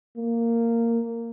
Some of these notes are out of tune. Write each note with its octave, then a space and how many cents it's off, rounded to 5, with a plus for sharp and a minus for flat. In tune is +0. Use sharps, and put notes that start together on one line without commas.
A#3 -10